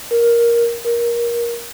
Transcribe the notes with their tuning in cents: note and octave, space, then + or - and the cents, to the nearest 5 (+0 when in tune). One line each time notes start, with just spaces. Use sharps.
A#4 +10
A#4 +20